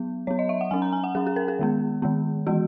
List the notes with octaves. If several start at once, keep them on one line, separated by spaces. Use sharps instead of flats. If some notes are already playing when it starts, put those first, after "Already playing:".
Already playing: F#3 B3
F#3 B3 C#5
D#5
E5
F#5
F#3 C#4 G#5
A#5
G#5
F#5
F#3 C#4 G#4
G#4
A#4
G#4
D#3 G#3 B3
D#3 G#3 B3
E3 G#3 B3 F#4